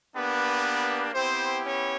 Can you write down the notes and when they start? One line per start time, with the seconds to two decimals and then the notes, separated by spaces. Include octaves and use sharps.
0.15 A#3 B3 D4 G4 B4
1.14 B3 C4 E4 G4 C5
1.64 C#4 C#5